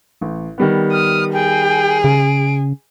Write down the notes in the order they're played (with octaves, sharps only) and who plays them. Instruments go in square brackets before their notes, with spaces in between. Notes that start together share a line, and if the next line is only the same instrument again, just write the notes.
[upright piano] A1
D#3 G3 B3
[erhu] D#6 [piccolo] F6
[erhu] G#4 [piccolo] G5
[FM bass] C#3 [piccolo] D7